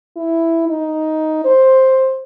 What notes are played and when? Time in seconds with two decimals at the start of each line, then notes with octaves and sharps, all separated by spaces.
0.16 E4
0.68 D#4
1.45 C5